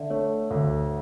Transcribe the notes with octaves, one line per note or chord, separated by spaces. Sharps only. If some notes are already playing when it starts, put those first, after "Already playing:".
Already playing: D3 D5 E5
A3 C#5
D2